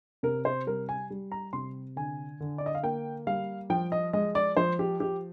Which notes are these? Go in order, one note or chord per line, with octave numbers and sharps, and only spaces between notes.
C3 A#4
C5
G3 A#4
G#5
G3
A#5
C3 C6
D3 G#5
D3
D5
D#5
F5
A#3 G5
G3 F5
F3 G5
D#5
G#3 D#5
D5
F3 C5
G4
F3 G4